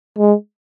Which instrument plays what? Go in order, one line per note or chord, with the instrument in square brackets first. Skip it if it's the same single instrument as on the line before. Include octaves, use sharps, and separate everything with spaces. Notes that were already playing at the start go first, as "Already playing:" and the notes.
[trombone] G#3